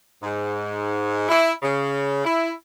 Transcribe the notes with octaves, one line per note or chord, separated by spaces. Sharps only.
G#2
E4
C#3
E4